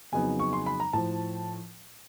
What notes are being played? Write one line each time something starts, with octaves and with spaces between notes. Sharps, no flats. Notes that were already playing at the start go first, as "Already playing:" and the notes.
F2 C#3 F#3 B3 D#4 G#5
C#6
C6
B5
A#5
A2 F3 A5